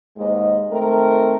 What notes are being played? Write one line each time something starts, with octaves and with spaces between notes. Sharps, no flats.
D#2 G#2 G#3 D#5
D#3 A3 C4 A#4